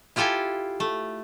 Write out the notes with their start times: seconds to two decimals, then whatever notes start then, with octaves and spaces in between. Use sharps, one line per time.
0.16 E4 F4 G4 A4 G5 G#5
0.80 A3